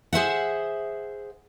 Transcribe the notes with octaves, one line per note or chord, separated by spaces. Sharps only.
G#4 C5 E5 F#5